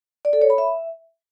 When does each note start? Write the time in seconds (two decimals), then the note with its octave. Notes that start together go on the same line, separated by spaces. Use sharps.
0.25 D5
0.33 A4
0.41 C#5
0.50 B5
0.58 E5